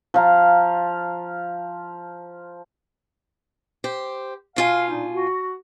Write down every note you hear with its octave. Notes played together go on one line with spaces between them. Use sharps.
F3 F5 A#5
G4 C5
B2 F4 F5 G#5
A#2 D4 D#4
F#4